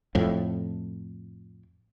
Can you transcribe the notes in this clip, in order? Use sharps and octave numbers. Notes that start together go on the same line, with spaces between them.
F2 A2